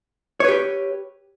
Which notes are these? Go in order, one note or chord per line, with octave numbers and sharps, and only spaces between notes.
G4 B4 C#5